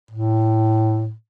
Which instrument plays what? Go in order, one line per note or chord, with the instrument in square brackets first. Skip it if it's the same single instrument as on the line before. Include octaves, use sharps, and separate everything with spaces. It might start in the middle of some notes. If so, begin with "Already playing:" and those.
[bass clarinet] A2